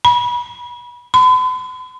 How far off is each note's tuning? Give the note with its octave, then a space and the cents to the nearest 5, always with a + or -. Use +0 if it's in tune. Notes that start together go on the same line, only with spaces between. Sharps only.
B5 -30
B5 +45